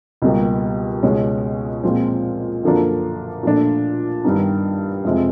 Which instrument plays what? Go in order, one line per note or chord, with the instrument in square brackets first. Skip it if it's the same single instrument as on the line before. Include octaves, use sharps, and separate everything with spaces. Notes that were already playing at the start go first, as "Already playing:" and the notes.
[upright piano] C#2 B2 G3 A#3
C#2 B2 G#3 C#4
A#2 F3 G#3 C4
F#2 D3 F3 A#3 D4
A#2 F3 A3 D4
G2 D#3 G3 B3 D#4
F2 C3 F3 G#3 C4